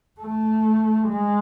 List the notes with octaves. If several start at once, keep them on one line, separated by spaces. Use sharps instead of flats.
A3
G#3